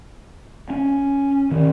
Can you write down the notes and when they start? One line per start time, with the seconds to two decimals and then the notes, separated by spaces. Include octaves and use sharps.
0.70 C#4
1.51 D#3 C#4